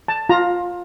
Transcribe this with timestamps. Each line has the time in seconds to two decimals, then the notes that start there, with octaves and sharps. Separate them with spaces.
0.08 A5
0.29 F4 A#5